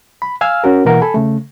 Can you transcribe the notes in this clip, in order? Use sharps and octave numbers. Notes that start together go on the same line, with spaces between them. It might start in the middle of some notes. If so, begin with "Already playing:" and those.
B5
F5 G#5 E6 F6
C#4 F#4 A#4
B2 E3 A#3 A#4 F#5
A4 G#5 B5
C#3 A3